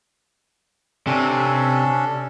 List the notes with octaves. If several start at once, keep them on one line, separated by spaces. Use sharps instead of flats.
C3 C#4 D4 A4